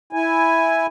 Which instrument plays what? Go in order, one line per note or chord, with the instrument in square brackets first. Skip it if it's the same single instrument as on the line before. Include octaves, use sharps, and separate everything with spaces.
[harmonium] E4 G#5